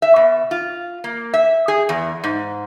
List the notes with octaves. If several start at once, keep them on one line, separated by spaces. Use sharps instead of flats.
E5
B2
F4
A#3
E5
G#4
E2
G#2